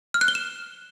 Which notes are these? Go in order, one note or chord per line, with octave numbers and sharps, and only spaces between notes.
F6
F#6
G7
E7